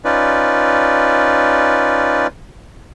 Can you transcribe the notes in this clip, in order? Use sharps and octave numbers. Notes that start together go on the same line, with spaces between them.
C#4 D#4 F4 B4 D5